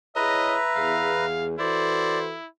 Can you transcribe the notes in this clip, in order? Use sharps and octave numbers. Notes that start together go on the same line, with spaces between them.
E4 G#4 B4 C#5 D#5 E5 A#5
E2 G#4 F5
E3 E4 F#4 A4 C5 D5